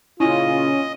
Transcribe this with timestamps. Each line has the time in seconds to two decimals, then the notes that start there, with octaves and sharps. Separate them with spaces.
0.20 A#2 C#3 C#4 E4 F4 D#5